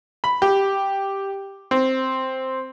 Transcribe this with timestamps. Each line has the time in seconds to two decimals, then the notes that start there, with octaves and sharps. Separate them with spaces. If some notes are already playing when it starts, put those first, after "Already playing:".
0.24 B5
0.42 G4
1.71 C4